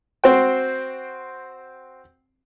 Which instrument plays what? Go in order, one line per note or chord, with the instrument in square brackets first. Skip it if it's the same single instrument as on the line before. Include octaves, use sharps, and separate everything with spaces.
[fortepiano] C4 F#4 C5 G5